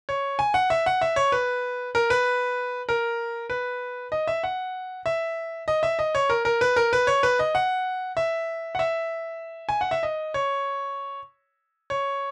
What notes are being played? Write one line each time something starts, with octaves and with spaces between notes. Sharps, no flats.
C#5
G#5
F#5
E5
F#5
E5
C#5
B4
A#4
B4
A#4
B4
D#5
E5
F#5
E5
D#5
E5
D#5
C#5
A#4
A#4
B4
A#4
B4
C#5
B4
D#5
F#5
E5
F#5
E5
G#5
F#5
E5
D#5
C#5
C#5